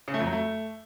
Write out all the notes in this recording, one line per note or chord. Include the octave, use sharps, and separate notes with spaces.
C#3
A3
F2
F#3
A3